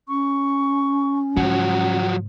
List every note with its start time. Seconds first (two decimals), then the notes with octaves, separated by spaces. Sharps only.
0.08 C#4 C#6
1.37 G#2 C#3 F3 F#3 F#5